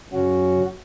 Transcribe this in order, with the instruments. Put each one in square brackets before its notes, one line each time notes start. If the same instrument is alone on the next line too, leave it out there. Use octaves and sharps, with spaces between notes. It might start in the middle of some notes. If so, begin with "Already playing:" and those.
[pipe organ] F#2 C#3 F#3 C#4 F#4